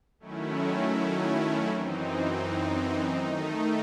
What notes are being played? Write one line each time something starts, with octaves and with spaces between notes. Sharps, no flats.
D#3 F#3 A3 C#4 E4
F#2 E3 C4 D#4
D#3 A3 D#4